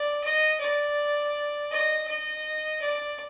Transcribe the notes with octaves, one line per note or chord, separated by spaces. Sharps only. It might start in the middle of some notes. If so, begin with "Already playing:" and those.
Already playing: D5
D#5
D5
D#5
D#5
D5